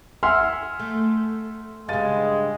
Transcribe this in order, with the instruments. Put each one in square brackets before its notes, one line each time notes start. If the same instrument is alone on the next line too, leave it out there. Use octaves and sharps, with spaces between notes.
[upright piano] E5 C6 F6 [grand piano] F#5 G#5 E6
[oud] A3
[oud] G2 C#3 [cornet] G#3 [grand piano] F5 A6 D#7